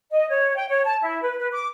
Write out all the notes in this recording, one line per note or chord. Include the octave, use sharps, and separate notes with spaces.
D#5
C#5
G5
C#5
A5
E4
B4
B4
D6